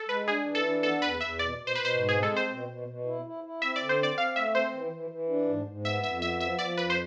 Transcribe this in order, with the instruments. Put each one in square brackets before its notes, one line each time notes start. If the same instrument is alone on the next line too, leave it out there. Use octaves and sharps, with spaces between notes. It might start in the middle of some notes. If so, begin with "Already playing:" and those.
Already playing: [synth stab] A4
[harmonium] G#3 [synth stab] B4
[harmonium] D4 [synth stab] G#4
[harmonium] E3
[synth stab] A4
[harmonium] D4
[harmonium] B3 [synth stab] A4
[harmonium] E2 [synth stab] B4
[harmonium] E2 [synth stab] E5
[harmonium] B2 [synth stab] D5
[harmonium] B2
[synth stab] C5
[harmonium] B2 [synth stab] B4
[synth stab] C5
[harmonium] G#2
[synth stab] G#4
[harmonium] G#3
[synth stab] A4
[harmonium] C4 [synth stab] C5
[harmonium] B2
B2
B2
E4
E4
E4
[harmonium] C4 [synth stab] E5
[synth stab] D5
[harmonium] D3
[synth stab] C5
[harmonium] C4 [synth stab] D5
[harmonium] C4 [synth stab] F5
[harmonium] A3 [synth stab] E5
[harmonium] C4 [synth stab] C5
[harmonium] E3
E3
E3
D4
G#2
G#2
[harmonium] B3 [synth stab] E5
[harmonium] F2 [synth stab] E5
[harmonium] B3 [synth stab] E5
[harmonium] F3 [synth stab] E5
[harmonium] F3 [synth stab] D5
[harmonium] F2 [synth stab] B4
[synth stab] C5